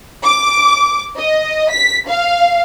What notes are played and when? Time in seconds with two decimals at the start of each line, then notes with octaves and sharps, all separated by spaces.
0.24 D6
1.17 D#5
1.71 B6
2.08 F5